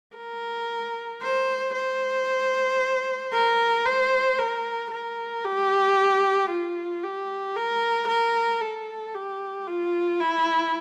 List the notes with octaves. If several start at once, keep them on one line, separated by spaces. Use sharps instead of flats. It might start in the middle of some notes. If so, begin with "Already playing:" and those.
A#4
C5
C5
A#4
C5
A#4
A#4
G4
F4
G4
A#4
A#4
A4
G4
F4
E4